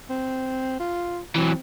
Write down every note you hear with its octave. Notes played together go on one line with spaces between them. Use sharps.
C4
F4
E3 F#3 C4